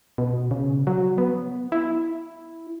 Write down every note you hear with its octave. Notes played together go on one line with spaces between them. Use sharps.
B2
C#3
F#3
B3
E4